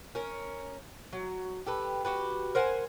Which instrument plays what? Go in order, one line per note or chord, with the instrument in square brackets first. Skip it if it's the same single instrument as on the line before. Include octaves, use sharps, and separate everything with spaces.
[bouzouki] C#4 A#4
F#3
G4 A4 B4
F#4 G4 B4
A#4 C5 F#5 G#5